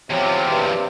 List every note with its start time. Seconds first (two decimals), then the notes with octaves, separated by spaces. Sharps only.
0.11 E2 C3 F3 F#3
0.51 G2